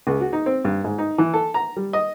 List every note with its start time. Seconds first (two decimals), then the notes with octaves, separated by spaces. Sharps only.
0.07 C#2
0.21 F#4
0.33 D#4
0.46 C4
0.65 G2
0.84 G#2
0.98 D#4
1.18 E3
1.34 A4
1.54 A#5
1.77 G3
1.93 D#5